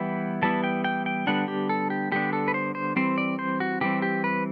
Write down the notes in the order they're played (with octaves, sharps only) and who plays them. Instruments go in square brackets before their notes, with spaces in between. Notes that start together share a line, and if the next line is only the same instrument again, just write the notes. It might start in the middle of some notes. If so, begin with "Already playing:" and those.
Already playing: [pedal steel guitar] E3 G3 B3 E4 G5
E3 G3 B3 E4 A5
G5
G5
G5
D3 G3 B3 D4 F#5
G4
A4
G4
D3 G3 B3 D4 G4
A4
B4
C5
C5
E3 G3 C4 C5
D5
C5
F#4
E3 G3 C4 G4
G4
B4